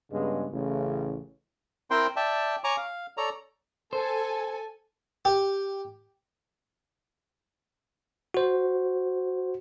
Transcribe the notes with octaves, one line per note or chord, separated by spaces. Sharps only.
G2 C#3 G#3 B3
A1 A2 C#3
C4 E4 A#4 C5 G5 C6
D5 E5 G5 A5
C#5 G#5 A#5 C#6 D6
F5
A4 C#5 D5 A#5
A4 C5 G#5
G4
F#4 C5